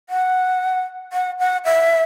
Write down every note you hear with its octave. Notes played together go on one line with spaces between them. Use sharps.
F#5
F#5
F#5
E5